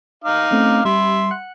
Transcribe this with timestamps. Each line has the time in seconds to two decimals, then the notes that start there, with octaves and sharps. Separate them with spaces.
0.24 D#4 F5 D6
0.51 A3 C4 C#4
0.85 G3 E5 B5 C6
1.31 F#5 F#6 C#7